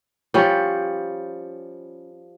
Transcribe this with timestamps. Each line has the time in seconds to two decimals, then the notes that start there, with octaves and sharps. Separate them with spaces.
0.34 F3 G3 C#4